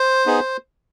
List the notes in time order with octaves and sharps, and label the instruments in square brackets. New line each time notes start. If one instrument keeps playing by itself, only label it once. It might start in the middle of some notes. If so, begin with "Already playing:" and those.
Already playing: [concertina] C5
B3 D#4 G#4